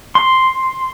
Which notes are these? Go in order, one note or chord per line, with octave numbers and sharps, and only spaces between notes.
C6